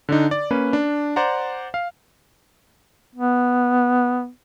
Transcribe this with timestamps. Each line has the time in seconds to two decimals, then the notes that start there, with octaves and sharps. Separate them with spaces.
0.09 D3 D4 D#4
0.31 D5
0.51 A#3 C#4 B4
0.73 D4
1.16 C5 D5 F#5 A#5
1.74 F5
3.15 B3